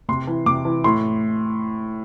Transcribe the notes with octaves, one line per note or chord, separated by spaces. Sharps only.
C3 C6
E3
C3 D6
E3
A2 C6